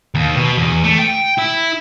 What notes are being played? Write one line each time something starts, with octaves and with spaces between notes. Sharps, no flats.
D#2
B2
E2
A3
G5
E4